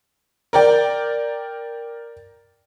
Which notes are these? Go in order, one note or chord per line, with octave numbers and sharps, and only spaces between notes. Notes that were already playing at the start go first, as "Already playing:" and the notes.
A#4 D5 G5